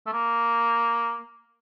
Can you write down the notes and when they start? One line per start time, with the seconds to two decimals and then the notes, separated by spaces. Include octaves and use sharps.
0.07 A3
0.13 A#3